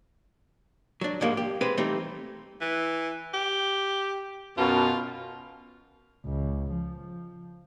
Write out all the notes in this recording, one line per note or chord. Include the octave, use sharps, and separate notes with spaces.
F#3 D4
G#2 F3 G3 G#3 A#3
G4
G#3 C4 G4 B4 C5
E3 G3 A3 C4 D#4
E3
G4
F#2 B2 F4
C#2
F3